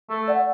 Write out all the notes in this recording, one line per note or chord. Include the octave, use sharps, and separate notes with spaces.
A3 A4
D5 F#5